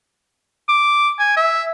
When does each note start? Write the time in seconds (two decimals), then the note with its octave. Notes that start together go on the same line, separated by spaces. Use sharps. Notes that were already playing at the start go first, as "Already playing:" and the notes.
0.69 D6
1.19 G#5
1.37 E5